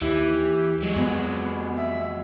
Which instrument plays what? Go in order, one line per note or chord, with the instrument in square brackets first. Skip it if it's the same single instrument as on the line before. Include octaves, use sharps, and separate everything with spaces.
[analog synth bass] D#2 [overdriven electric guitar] E3 [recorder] G4
[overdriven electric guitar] F#3 G#3
[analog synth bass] F2 [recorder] B3
[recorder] E5